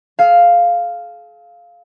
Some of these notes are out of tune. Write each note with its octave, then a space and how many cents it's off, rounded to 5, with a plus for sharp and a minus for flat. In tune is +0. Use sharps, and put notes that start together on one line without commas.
G#4 +45 F5 +0